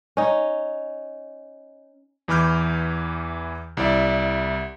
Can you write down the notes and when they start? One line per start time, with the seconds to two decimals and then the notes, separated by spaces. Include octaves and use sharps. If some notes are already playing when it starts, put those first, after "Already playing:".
0.17 C#4 D#4
2.28 E2 E3 B5 D6 F6 G6
3.77 C2 E4 D5 E5